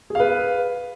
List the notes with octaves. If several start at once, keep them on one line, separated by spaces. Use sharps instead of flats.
G#4 B4 F5